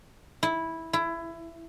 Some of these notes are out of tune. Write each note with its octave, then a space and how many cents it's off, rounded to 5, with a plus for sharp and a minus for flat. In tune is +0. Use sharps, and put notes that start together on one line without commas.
E4 -10
E4 +20